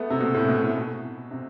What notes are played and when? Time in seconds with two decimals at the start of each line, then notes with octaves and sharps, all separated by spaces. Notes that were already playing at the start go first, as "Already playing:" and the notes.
Already playing: A3 B3
0.10 C3
0.20 B2
0.34 A2
0.48 B2
0.62 A2
0.75 B2
1.31 C3